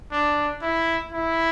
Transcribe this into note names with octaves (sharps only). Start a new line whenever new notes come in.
D4
E4
E4